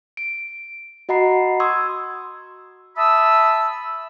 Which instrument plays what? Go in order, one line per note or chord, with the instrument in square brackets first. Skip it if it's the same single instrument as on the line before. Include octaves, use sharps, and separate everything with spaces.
[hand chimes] D7
F#4 D#5 F#5 A#5 B5 C7
C6 C#6 D#6 E6 G#6
[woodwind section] E5 A5 B5 D#6 E6